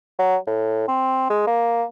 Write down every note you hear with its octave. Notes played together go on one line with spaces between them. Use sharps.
F#3
A2
C4
G#3
A#3